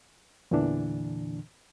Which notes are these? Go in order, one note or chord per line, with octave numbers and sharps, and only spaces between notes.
E2 A#2 D3 E3 D4